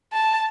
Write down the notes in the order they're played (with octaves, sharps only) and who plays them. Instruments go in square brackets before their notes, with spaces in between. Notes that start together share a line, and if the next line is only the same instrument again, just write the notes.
[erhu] A5